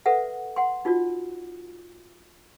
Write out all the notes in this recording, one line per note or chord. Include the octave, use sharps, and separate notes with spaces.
A4 B4 E5 F#5
F#5 C6
D#4 F4 F#4 D5